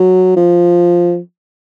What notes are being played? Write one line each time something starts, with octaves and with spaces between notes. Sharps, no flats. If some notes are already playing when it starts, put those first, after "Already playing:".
Already playing: F#3
F3